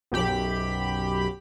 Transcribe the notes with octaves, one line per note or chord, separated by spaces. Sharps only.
B1 F#2 G4 B5